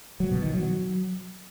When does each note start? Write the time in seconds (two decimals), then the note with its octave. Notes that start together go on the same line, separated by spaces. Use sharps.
0.20 F#3
0.31 B2
0.42 D#3
0.53 F#3